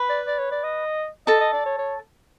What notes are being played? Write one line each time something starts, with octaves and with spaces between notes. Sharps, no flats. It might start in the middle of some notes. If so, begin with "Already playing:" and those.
Already playing: B4 B5
D5
D5
C#5
D5
D#5
A4 D#5 A5
D#5
D5
C#5
C#5